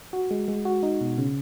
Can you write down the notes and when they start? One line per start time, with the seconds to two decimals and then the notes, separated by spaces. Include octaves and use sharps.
0.13 F#4
0.31 G#3
0.48 G#3
0.65 F#4
0.83 D#4
1.01 B2
1.18 C#3